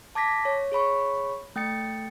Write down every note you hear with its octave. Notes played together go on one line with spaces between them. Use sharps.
A5 D6 G#6 A#6 B6
C#5
G#4 C#5 B5 C#6
A3 G5 A6 C#7